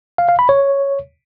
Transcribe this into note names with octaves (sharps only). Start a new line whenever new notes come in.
F5
F5
B5
C#5